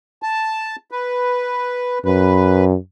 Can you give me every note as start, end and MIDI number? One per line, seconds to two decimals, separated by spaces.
0.22 0.76 81
0.91 1.99 71
2.05 2.76 42
2.05 2.65 71